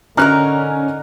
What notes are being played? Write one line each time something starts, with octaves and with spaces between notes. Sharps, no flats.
D3 C#4 D#4 E4 A#4 A#5 F6 F#6